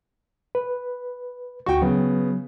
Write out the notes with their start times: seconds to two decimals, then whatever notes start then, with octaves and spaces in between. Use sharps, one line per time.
0.55 B4
1.66 D2 F#4 G5 C#6
1.82 C#3 F#3 B3